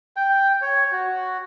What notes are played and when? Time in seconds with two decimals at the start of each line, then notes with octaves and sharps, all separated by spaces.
0.16 G5
0.62 C#5
0.92 F#4